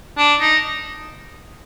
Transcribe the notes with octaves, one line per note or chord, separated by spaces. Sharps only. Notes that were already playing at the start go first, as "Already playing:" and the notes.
D4
D#4